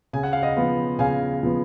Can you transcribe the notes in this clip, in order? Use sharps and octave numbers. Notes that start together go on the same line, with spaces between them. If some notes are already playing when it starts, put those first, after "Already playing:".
C#3 G#5
F#5
F5
D#5 F#5
F3 B3 F4
C#3 F5 G#5
F3 B3 F4